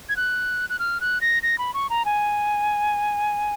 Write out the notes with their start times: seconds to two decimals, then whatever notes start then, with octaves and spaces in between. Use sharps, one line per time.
0.09 G#6
0.17 F#6
0.70 F#6
0.79 F6
1.01 F#6
1.21 A#6
1.43 A#6
1.58 B5
1.74 C#6
1.90 A#5
2.05 G#5